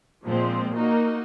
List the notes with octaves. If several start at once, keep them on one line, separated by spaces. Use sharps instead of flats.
A#2 F3 G#3 C4
A#3 D#4 F#4